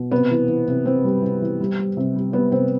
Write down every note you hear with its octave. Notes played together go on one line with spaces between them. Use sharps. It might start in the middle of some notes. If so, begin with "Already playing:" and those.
Already playing: B2
C3 B3
E3
E3
C3
C3 C4
G3
C3
E3
G3
G3
C3
G3
G3 B3
C3 C4